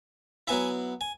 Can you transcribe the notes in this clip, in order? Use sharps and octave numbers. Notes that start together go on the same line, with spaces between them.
F#3 B3 E4 E5 G#5
G#5